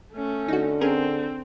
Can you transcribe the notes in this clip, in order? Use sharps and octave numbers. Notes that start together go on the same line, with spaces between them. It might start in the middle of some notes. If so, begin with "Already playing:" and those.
A3 C#4
D3 D#4 F#4
C4 C#4 G#4 A#4